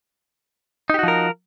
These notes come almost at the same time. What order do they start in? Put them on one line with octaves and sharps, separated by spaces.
D#4 G4 F#4 F3 A#4